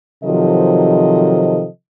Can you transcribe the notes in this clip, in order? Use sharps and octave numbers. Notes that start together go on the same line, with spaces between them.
C3 D#3 F3 F#3 A4 D#5